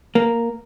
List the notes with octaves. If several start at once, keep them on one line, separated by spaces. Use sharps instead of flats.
A#3